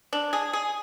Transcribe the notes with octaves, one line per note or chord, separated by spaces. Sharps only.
D4
G#4
G#4